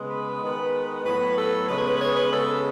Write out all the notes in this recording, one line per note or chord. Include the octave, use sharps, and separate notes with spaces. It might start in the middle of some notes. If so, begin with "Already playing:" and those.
Already playing: C#3 G#3 B3
B4
D#3 G#3 B3
A2 F#3 B3 B4
A4
C#3 G#3 B3 B4
C#5
B4
B4
C#5
B4
C#3 G#3 B3 A4